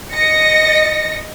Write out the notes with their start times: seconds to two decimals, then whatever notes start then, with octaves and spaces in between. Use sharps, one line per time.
0.14 D#5 A#6 C#7